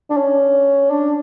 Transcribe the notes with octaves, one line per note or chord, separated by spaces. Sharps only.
D4
C#4
D4